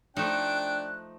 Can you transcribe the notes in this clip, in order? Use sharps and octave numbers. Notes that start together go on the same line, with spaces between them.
F3 A3 D4 D#4 G5 F#6